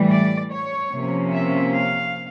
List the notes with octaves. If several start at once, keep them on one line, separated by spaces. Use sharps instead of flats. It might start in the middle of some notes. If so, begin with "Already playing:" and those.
Already playing: A2 E3 G3
D5
C#5
C3 F3 A#3 C#4
E5
F5